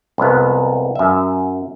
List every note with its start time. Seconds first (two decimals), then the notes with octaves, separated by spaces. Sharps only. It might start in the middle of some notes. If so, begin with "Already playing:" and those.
0.18 C2 F2 G#3 B3
0.96 F#2 E5